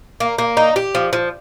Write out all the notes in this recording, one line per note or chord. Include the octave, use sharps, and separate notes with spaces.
A#3
A#3
D#4
G4
F3
F3